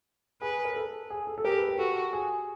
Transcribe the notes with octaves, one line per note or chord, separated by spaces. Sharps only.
G#4 B4
A#4
A4
G#4
A4
A4
G4 G#4 A#4
B4
A#4
F#4 A4
G#4